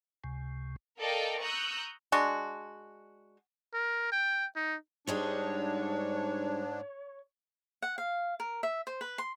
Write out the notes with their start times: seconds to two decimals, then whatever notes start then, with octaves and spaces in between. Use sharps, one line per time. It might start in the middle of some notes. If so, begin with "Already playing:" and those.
0.24 C#2 C3
0.98 A4 A#4 D5 D#5 F5 G5
1.41 A#5 C#6 D#6 E6 F#6 G6
2.12 G#3 D4 F#4
3.74 A#4
4.12 G5
4.56 D#4
5.07 G#2 G3 G#3 D4 D#4 C#5
7.82 F#5
7.98 F5
8.40 A#4
8.63 E5
8.87 C5
9.01 B4
9.18 C6